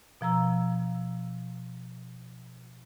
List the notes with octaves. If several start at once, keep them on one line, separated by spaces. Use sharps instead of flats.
B2 F3 A#5 E6